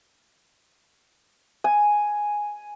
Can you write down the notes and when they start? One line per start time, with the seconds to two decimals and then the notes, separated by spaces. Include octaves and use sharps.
1.64 G#5